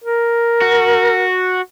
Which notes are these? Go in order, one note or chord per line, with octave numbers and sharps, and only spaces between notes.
A#4
F#4